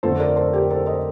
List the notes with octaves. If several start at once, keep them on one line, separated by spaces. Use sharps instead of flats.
F2 D3 A3 A4 C5
A#4 D5
A4 C5
G4 A#4
A4 C5
C5 D#5